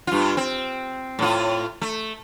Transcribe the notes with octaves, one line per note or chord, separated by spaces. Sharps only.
G2 F4
C4
A2 F4
A3